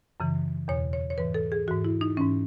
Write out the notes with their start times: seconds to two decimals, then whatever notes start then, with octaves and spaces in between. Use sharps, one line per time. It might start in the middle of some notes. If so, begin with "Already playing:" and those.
0.20 F#2 C#3 E3
0.68 E2 B2 C#5
0.93 C#5
1.10 C#5
1.18 G#2 E3 B4
1.34 A4
1.52 G#4
1.68 G#2 E3 F#4
1.85 E4
2.01 D#4
2.16 G#2 E3 C#4